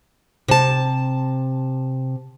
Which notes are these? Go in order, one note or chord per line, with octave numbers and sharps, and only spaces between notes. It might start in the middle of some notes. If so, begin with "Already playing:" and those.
C3 A5